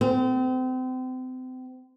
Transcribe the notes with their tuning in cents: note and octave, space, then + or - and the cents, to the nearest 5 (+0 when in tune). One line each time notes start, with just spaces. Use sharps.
C4 -35